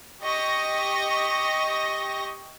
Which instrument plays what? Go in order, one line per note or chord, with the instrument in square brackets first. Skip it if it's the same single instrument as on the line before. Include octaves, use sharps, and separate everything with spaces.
[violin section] G4 D#5 C#6 A#6